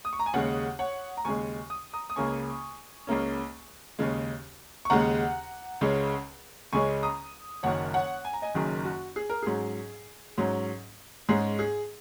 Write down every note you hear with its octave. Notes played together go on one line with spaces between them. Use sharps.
D#6
C#6
A#5
G#5
D#2 C#3 G#3 C#5 F#5
C#5 F#5
A#5
D#2 C#3 G#3 G#5 C#6
D#6
A#5 D#6
D#6
C#2 C#3 A#3 C#4 G#5 C#6
C#2 C#3 A#3 C#4
D#2 C#3 G#3
C#6
D#2 C#3 G#3 F#5 A#5
C#2 C#3 G#3 C#4
C#2 C#3 G#3 C#4 G#5 C#6
A#5 D#6
F#1 F#2 D#3 C#5 F#5
C#5 F#5
G#5
A#5
D#5 G#5
F#1 F#2 D#3 G#4
F#4
G#4
A#4
G#2 F#3 C#4 G#4
G#2 F#3 C#4
G#2 G#3 C#4 G#4
G#4